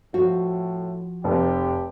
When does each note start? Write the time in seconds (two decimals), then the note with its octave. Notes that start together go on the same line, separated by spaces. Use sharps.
0.14 A2 F3 F#4
1.24 F1 G4